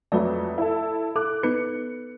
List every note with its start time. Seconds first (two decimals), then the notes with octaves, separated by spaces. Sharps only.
0.12 F2 F#3 A3 B4 D5
0.58 E4 A4
1.16 A4 D6 F#6
1.43 B3 D#4 B4 C#7